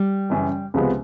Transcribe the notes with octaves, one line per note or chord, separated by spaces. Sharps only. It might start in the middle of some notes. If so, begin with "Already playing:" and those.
Already playing: G3
F#2 C#3 E3
C#2 C3 F3 G#3 B3